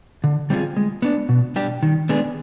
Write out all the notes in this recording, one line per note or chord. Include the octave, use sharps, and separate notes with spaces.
D3
G3 C4 F4 G#4
G#3
B3 D4
B2
G3 D4 G4
D#3
G#3 B3 D4 G#4